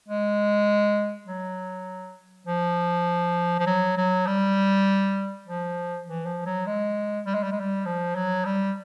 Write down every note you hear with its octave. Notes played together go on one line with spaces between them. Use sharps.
G#3
F#3
F3
F3
F#3
F#3
G3
F3
E3
F3
F#3
G#3
G3
G#3
G3
G#3
G3
F3
F#3
G3